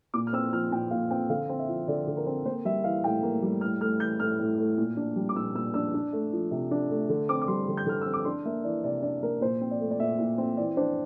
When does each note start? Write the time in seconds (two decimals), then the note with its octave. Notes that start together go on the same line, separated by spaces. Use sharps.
0.14 A#2 D6
0.27 F6
0.33 C4 E6
0.53 F3 F6
0.72 A#2 G5
0.91 A#2 F5
1.10 C4 G5
1.30 D3 F5
1.49 C4
1.59 E5
1.69 F3
1.88 D3 D5
2.07 D3
2.17 A#4
2.26 C4
2.45 A#3 C5
2.65 G3 E5
2.84 E3 F5
3.04 A2 G5
3.23 A#3
3.42 G3
3.61 A2 F6
3.81 A3 F6
4.00 E3 G6
4.20 A2 F6
4.39 A2
4.58 A3
4.78 A#2
4.97 D4
5.16 G3
5.29 D6
5.35 A#2 E6
5.55 A#2 E6
5.74 D4 E6
5.94 D4
6.13 A3
6.33 F3
6.51 C3
6.71 D4
6.91 A3
7.09 D3
7.29 C4 D6
7.42 D6
7.48 G3 C6
7.68 D3
7.77 G6
7.86 D3 F6
8.01 C4 E6
8.13 D6
8.25 D4 C6
8.45 A#3 E5
8.64 E3 D5
8.84 C3 D5
9.02 D4 D5
9.23 A#3 A#4
9.41 A#2 C5
9.61 C4
9.71 D5
9.80 A3
9.91 D5
9.99 A#2 E5
10.18 A#2
10.38 C4
10.57 E3 D5
10.77 D4 C5